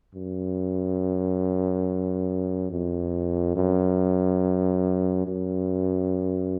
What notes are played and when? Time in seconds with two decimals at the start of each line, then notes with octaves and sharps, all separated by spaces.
0.15 F#2
2.71 F2
3.56 F#2
5.27 F#2